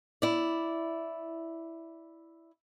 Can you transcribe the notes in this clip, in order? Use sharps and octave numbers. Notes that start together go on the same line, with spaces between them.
E4 D5